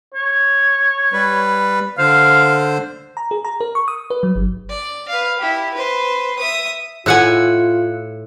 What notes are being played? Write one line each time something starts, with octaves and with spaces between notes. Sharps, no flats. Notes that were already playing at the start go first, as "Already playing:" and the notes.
C#5
G3 B4
D3 C5 F5
A#5
G#4
A#5
A#4
C#6
D#6
B4
F#3
G1
D5
B4 F5
E4 G4
B4 C5
E5 D#6
A2 F4 F#5 G#5 E6 F#6 C#7